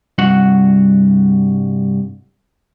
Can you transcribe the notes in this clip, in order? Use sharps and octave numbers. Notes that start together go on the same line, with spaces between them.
C2 G2 F#4 F#5